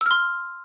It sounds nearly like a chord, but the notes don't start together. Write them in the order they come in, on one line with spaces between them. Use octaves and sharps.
E6 F6 C6